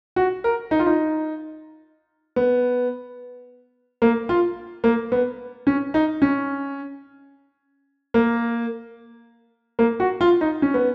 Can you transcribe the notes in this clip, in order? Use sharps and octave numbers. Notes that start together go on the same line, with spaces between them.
F#4
A#4
D#4
F4
D#4
B3
A#3
F4
A#3
B3
C#4
D#4
C#4
A#3
A#3
F#4
F4
D#4
C#4
B3